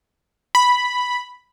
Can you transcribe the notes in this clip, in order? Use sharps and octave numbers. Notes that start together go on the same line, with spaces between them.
B5